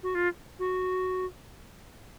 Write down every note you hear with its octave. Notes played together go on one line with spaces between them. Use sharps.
F#4
F4
F#4